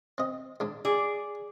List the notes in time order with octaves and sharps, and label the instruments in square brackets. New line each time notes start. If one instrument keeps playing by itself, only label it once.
[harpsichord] C4 D#5
G#2 D4
[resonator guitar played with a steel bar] G#4 D5